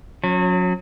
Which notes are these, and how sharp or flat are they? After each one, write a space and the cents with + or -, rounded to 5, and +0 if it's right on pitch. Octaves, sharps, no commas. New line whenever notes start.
F#3 -30 C#4 +0